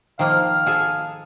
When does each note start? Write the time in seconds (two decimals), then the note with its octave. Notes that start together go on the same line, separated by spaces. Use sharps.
0.19 D#3 F3 A#3 F5
0.66 G#4 A4 G#5